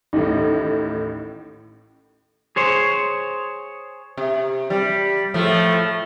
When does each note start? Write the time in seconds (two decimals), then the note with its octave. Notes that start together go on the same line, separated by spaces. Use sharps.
0.13 A1 D#2 A2
2.56 G#4 C5 C#5
4.17 C3
4.70 G3
5.34 A2 F3 A3